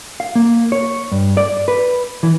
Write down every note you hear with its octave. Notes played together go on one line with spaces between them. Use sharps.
F5
A#3
C#5
G2
D5
B4
E3